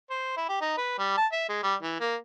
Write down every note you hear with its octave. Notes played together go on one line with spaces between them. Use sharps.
C5
E4
G4
D#4
B4
G3
A5
E5
G#3
G3
E3
A#3